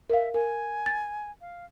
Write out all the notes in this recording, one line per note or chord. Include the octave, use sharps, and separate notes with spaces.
A#4 E5 F5
A#4 G#5
A6
F5